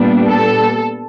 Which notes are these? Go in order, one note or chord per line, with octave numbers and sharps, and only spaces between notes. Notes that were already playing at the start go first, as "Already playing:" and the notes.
Already playing: A#2 G3 B3 D4
A4